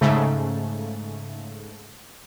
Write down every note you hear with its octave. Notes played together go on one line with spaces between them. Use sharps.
G#2 C#3 A3